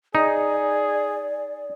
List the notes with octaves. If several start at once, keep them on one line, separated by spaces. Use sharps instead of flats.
D#4 G#4 D5